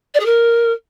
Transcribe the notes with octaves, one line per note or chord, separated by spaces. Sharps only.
D5
G#4
A#4